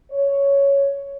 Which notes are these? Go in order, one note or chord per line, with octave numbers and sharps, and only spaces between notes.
C#5